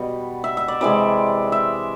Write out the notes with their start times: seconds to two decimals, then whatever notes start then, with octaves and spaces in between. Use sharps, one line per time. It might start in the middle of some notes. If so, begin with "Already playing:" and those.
Already playing: B2 G3
0.44 E5
0.57 E5
0.68 D5
0.81 C3 E3 G#3 D5
1.52 E5